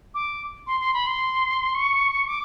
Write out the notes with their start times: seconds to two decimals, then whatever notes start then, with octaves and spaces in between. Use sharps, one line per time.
0.14 D6
0.67 C6
0.81 C6
0.94 B5
1.07 C6
1.74 C#6
2.28 D6